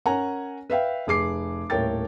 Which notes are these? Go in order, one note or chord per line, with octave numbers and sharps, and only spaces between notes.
C#4 A#4 C#5 F#5 G#5 A#5
B4 E5 F5 G5
F1 G#4 D6 C7
D#1 A2 A#4 C#5 G5 A6